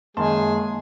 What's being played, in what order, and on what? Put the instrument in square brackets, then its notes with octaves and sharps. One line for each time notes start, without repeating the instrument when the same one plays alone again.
[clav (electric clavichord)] F#2 D#3 [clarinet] G#3 [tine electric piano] A#3 A5 C6 [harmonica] G#4